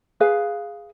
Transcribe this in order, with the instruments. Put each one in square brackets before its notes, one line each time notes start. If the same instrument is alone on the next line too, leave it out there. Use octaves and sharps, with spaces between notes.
[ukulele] G#4 B4 F5